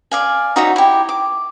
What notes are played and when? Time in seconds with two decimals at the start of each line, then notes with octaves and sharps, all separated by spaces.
0.11 D5 F5 G#5
0.56 D#4 F#4 C#5 E5
0.76 E4 G4
1.09 D6